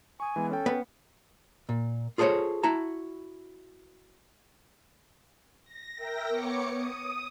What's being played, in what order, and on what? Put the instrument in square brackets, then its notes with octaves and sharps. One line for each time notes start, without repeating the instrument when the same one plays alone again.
[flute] G#5 [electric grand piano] C#6 D#6
[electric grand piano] E3 G#3 B3
[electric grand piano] C#4 G5 [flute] A4
[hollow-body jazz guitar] B3
A#2
F4 G#4 A4 C5 C#5
E4 F#4 A5 A#5
[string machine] A#6
A#4 E5 G5 A#6
B3 C#5 D6 C#7
D#6